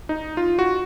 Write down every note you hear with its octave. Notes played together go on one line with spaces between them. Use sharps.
D#4
F4
F#4